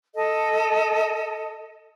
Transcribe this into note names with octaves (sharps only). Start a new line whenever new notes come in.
A4 D#5